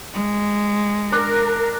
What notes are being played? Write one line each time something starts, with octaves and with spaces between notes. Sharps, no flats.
G#3
D4 A#4